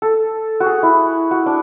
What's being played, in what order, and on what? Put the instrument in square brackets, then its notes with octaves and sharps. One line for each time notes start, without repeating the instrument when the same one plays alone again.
[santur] A4
F#4
G#4
E4
F#4
D4